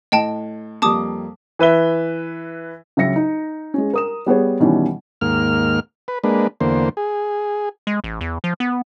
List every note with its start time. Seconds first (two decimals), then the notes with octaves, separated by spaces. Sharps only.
0.12 A2 D#5 G5 A5
0.82 F2 G3 A#3 A5 D6 D#6
1.59 E3 B4 E5 G7
2.97 C#2 F#3 E5 A#6 C#7
3.16 D#4
3.74 G#3 C#4
3.93 A#4 D#6 E7
4.26 G3 B3 G#4 C#5
4.60 B2 D#3 E3 G3 C#4
5.21 D#2 G#2 A#3 F6
6.08 B4
6.24 G#3 A#3 D4 B4
6.60 E2 D3 A#3 C5
6.97 G#4
7.87 G#3
8.04 A1
8.21 E2
8.44 F3
8.60 B3